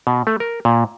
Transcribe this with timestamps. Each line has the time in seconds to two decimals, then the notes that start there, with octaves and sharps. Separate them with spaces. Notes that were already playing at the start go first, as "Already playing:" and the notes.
0.07 B2
0.27 A3
0.40 A#4
0.65 A#2